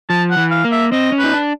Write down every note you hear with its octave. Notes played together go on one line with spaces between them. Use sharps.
F3 A5
F#5
E3
F5
A#3
E5
C4 D#5
C#4
D#4 B4
D4